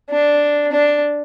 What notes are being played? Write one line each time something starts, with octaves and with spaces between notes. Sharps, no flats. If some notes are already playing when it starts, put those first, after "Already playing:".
D4
D4